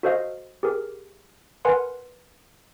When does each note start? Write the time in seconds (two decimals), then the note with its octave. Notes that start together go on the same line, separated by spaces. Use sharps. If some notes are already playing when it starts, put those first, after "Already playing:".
0.03 F#4 A4 C5 D#5 F5
0.63 G4 G#4 A#4
1.65 A#4 B4 F#5 G#5 C6